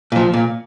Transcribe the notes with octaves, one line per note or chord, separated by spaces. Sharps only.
A#2 F3
A#2